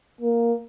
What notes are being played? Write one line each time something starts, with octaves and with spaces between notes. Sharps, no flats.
A#3